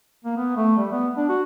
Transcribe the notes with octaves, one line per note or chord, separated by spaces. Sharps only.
A#3
B3
A3
G3
B3
D4
F#4